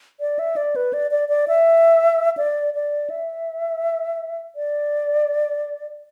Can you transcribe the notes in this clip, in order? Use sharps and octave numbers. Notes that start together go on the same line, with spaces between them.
D5
E5
D5
B4
D5
D5
D5
E5
D5
D5
E5
D5